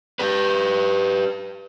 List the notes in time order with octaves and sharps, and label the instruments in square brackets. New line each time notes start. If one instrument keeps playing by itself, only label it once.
[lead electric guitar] G4 B4